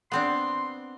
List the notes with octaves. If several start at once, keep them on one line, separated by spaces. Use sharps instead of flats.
B3 C4 D4 C6